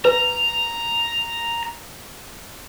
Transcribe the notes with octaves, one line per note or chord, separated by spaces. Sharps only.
B4 A#5